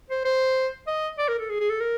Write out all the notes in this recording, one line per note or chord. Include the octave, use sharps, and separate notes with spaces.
C5
C5
D#5
D5
A#4
A4
G#4
G#4
A4
A#4